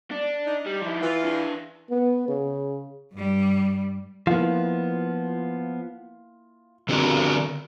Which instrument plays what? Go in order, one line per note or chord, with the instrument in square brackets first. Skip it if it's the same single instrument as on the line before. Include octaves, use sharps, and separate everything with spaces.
[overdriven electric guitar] D4
[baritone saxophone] D#4
[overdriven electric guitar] G3
F3 E4
[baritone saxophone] E3 [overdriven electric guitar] F4
[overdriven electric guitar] D4 F5
[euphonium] B3
C#3
[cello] G2 G3
[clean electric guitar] F3 B3 [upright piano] A#3 E4 F4
[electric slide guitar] D3 C4 D4 F#4 G4 A#4